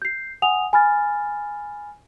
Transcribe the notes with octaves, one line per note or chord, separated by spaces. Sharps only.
G6 C7
F#5 G#5 D#6 F7
G#5 B5 F6 A6